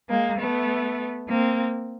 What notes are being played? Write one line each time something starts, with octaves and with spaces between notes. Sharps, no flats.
G#3 A#3
A3 B3
A#3 C4